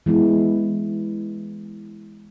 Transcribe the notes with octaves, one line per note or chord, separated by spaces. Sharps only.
E3 G#3 B3 E4